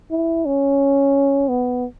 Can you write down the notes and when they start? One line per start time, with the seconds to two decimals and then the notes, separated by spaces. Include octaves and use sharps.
0.11 E4
0.46 C#4
1.49 B3